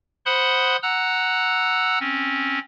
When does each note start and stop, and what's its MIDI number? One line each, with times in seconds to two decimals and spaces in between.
0.26 0.77 72
0.26 0.77 78
0.26 0.77 83
0.26 0.77 84
0.26 0.77 87
0.26 0.77 90
0.83 1.99 78
0.83 1.99 82
0.83 1.99 88
0.83 1.99 90
2.00 2.59 60
2.00 2.59 61